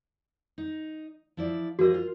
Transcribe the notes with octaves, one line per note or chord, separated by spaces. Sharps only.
D#4
F3 E4 D5
F3 F#4 G#4 A#4 D#5
F4